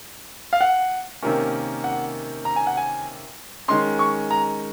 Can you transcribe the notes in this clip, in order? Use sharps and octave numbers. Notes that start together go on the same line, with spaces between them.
F5
F#5
C3 D#3 A#3 C#4
F#5
A#5
G#5
F#5
G#5
D#3 G#3 C#4 C6
C#6
A#5